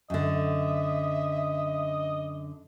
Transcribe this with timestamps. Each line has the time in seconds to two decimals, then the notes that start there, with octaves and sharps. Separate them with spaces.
0.10 F#2 D3 D#5 E5